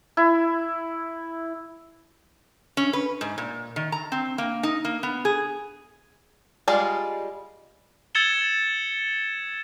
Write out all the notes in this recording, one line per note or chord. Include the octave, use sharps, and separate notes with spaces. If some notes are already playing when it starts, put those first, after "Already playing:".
E4
C#4
B4
G#2
A#2
D#3
A#5
C4
A#3
D#4
A#3
B3
G#4
G3 G#3 F4 G#4 D5
E6 G#6 A6 C#7 E7 G7